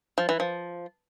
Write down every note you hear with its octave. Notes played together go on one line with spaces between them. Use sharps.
F3
E3
F3